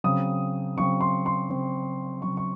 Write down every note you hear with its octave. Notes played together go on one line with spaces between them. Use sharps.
C#3 F#3 C4 D#6
C#3 F#3 C4 C#6
C6
C6
C#3 F#3 C4
C#3 F#3 C4 C#6
C#6